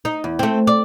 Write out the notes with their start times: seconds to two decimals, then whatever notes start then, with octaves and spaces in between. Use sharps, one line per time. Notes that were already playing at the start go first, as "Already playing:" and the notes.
0.05 D#4
0.24 E2
0.39 A3 C4
0.67 D5